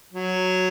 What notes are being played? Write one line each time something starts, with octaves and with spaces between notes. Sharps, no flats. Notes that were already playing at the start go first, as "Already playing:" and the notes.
F#3